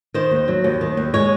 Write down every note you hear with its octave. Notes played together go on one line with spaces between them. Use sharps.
D#3 C5
D#2
F#3
D#2
D#3
D#2
G#3 C#5